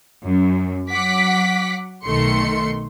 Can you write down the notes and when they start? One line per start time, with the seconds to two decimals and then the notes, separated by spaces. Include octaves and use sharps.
0.24 F#2
0.90 F#3 F#5 D6 B6
2.05 B1 D#3 A3 C6 C#7